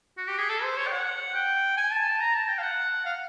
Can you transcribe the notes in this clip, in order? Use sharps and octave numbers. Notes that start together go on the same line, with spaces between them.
F#4
G4
G#4
A4
C5
C#5
G5
F#5
G5
G#5
A5
A5
A#5
A5
G5
F5
F#5
F5